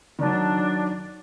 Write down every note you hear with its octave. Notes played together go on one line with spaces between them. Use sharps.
D#3 F#3 D4